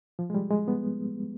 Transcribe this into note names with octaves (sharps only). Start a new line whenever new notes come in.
F3
G#3
G3
G#3
B3